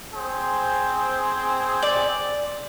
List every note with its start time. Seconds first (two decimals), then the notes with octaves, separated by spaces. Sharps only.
0.15 C4 G#4 C5
1.82 D5